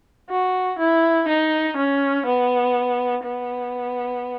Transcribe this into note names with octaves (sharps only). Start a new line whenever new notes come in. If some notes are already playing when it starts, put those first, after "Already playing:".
F#4
E4
D#4
C#4
B3
B3